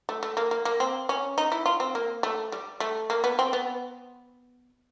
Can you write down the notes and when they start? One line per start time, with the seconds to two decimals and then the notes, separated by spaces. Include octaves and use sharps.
0.09 A3
0.23 A3
0.37 A#3
0.51 A#3
0.65 A#3
0.80 C4
1.09 C#4
1.38 D#4
1.52 E4
1.66 F4
1.80 C4
1.95 A#3
2.23 A3
2.52 G3
2.80 A3
3.10 A#3
3.24 B3
3.39 C4
3.53 B3